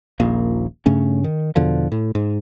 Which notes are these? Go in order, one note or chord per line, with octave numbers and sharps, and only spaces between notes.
D#1 A#1 A#3
G2 C#3 A3 C#4
D#3
E2 B2 D3 F3
A2
G#2